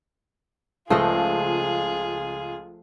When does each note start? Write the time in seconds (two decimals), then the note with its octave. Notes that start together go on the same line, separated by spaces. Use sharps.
0.90 C#2 F3 A3 F4 G#4 D#5